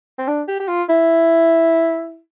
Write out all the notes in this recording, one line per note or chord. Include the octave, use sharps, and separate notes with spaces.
C4
D4
G4
G4
F4
E4